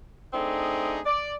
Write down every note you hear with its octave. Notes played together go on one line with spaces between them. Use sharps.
A3 C4 D4 D#4 G#4
D5